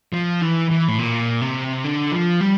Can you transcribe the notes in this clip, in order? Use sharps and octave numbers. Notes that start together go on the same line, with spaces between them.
F3
E3
E3
A2
A#2
C3
D3
F3
G3